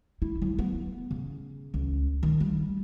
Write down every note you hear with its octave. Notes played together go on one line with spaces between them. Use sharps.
E4
F#3
B3
C#3
C#2
D#3
G3